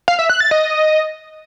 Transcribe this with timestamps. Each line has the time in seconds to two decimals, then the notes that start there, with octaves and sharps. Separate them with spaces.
0.08 F5
0.19 E5
0.30 F#6
0.40 A6
0.51 D#5